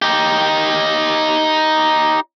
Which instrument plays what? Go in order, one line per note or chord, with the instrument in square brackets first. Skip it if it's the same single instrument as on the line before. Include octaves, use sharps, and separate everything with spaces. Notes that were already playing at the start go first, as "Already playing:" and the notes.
[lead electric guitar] D#4 G4